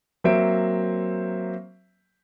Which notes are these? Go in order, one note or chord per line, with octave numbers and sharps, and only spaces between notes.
F#3 A#3 C4 C5 E5 D7